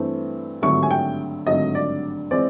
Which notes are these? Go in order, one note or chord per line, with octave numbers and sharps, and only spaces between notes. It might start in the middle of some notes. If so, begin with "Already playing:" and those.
Already playing: G2 E3 A3 C4
G#1 G2 D3 F#3 A3 C#6
G#5
G5
G#1 G2 D3 F#3 A3 D#5
D5
E3 G#3 C4 D5